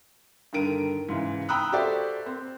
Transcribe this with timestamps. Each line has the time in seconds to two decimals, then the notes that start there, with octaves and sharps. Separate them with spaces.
0.53 G2 D3 D#3 A#4 D7 D#7
1.09 G#2 C#3 E3
1.49 G5 A#5 B5 D#6 E6 F#6
1.72 F#4 G4 A4 C5 D5 E5
2.26 C4